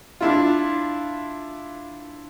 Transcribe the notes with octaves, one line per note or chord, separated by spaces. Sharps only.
D4 E4 F4